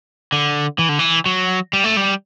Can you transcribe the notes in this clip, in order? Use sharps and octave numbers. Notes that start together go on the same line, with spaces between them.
D3
E3
D3
E3
F#3
G3
A3
G3